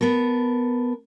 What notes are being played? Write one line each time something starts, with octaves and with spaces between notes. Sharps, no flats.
B3 A4 A#4